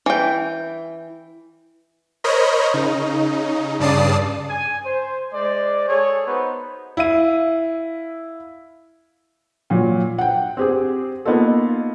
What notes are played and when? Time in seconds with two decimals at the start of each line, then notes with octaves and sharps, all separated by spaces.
0.06 E3 G5
2.24 A#4 C5 C#5 D#5 B5
2.74 C#3 D#4
3.80 G2 C#3 D5 A5 D#6 C7
4.48 G#5
4.86 C5
5.34 G#3 C5 D5
5.88 G#4 A4 C#5
6.27 B3 D#4 F#4 B4 C5
6.97 E4 F5 D#7
9.70 A#2 F#3
10.18 F#5 G5
10.57 C4 G4 G#4
11.25 A#3 B3 D#4 F4 A4